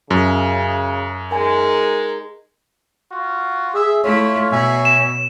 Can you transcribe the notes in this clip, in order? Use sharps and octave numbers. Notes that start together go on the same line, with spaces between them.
F#2 C#3
G#3 D#4 A#4 G#5
F4 F#4
G#4 E5
A3 E4 F4 C#5
B2 E5 G#5
E7